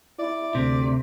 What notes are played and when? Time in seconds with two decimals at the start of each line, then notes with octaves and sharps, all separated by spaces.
0.19 E4 D5
0.55 D2 C3